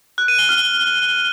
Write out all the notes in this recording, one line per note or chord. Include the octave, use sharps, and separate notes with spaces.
F#6
D#7
G7
F6